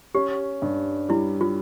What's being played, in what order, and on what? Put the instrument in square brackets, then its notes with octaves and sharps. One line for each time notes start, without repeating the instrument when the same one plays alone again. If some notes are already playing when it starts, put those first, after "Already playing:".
[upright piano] C#4 [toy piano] G4
[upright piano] G2
[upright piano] G3 [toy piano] E4
[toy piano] F4